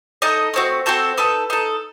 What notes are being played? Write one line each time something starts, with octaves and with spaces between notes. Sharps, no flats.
D#4 A4 D#5
A3 C4 F#4
C4 F#4 A4 C5
D#4 A4 B4
D#4 A4